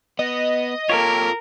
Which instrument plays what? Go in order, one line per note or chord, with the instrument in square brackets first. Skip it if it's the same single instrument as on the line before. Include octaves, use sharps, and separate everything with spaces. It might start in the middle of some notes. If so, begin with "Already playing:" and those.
[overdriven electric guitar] B3 [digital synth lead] D#5
[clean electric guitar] A#3 G4 C#5 [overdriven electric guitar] F4 A4 [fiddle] A#4